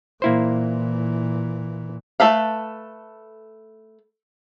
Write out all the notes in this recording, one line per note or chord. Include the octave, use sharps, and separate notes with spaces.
A#2 E3 A#3 E4 C5
A3 C#4 A4 B4 F5